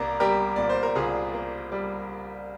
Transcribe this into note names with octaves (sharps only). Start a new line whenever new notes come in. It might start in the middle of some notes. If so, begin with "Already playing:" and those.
Already playing: C2 A#3 A#4 D5
G3 G4 A#4
A#2 D5
C5
A#4
C2 F4 G#4
A#3
G3